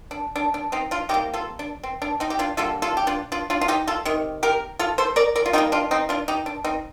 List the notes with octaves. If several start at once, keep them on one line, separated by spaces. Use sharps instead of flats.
D4
D4
D4
C4 D#4
D4 F4
C3 G3 A#3 D#4 G4
F4 A4
D4
C4
D4
C4 D#4
G4
D4 F4
D3 G3 A#3 F4 A4
F4 A4
G4
D4 F4
D4 F4
D4 F4
F4
D#4 G4
F4 A4
C3 D#3
G4 A#4
F4 A4
A4 C5
A#4 D5
A#4 D5
F4
D#3 G3 A#3 D#4 G4
D4 F4
C4 D#4
D4 F4
D#4 G4
D4
C4 D#4